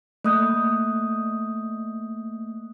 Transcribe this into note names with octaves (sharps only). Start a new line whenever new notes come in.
A3 A#3 D#6 F#6 G6